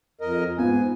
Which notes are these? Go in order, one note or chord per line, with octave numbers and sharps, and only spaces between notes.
F2 A#4 D#5
G#2 B3 F4 G#5